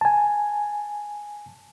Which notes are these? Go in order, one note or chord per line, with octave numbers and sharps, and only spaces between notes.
G#5 A5